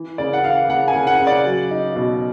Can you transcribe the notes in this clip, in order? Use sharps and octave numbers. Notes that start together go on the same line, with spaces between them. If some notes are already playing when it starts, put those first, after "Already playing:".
Already playing: E3
C#3 D5
F#5
E3 F5
C#3 F#5
G#5
C#3
F#5
C#3
D5
F#3
D#4
B2